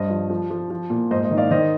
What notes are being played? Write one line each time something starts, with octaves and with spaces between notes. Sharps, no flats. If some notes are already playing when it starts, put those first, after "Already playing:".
Already playing: G2 C5 D#5
F3
F3
F3
F3
A#2
G#2 C5 D#5
C5 D#5
D#3
D5 F5
D#3 C5 D#5